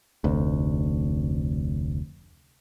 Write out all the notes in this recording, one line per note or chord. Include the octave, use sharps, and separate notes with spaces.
F1 D2